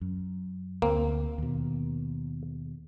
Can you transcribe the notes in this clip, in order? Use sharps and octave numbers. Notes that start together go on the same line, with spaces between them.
F#2
D2 A#3 C4
D#2 B2